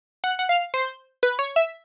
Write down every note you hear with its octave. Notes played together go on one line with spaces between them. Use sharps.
F#5
F#5
F5
C5
B4
C#5
E5